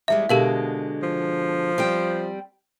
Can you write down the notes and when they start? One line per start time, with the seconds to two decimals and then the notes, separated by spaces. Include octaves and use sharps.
0.08 E2 G3 G#3 E5
0.29 B2 D3 G#3 G4 A#4 F5
1.03 F3
1.78 G3 C4 G5